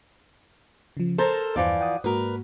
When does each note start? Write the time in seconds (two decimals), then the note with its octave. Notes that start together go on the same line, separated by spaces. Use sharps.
0.97 C#3 F3
1.18 A4 A#4 C5 C6 A6 A#6
1.56 E2 G2 E3 F3 D5
1.79 F#5 G5 D#6
2.04 G#2 A#3 F#4 A#4 B4